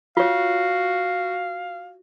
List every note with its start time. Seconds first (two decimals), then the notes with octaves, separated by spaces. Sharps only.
0.17 F4 F#4 C#5 F5